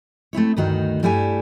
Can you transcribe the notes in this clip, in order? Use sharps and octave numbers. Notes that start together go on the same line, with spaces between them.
A3 C4 E4 C#5
D2 G2 D#3 D#4 F#4
G2 G3 A3 E4 G4 G#5